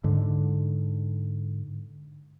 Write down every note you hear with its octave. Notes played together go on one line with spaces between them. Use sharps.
G#2 D3